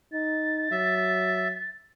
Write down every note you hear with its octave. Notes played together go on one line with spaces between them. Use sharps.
D#4 A6
F#3 E5